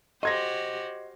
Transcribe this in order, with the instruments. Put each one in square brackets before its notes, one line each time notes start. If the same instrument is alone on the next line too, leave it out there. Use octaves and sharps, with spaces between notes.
[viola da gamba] F#4 G4 C5 [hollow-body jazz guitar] D#5 [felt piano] C6 G#6 A#6